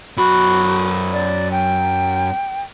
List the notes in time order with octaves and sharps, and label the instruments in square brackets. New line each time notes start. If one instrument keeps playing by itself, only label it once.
[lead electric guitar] F#2 B5 [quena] F#4
[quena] D5
G5